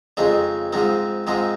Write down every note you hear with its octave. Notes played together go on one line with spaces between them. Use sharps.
F2 C#3 G#3 C4 D#4
G#2 F3 G#3 C4 D#4
G#2 F3 G#3 C4 D#4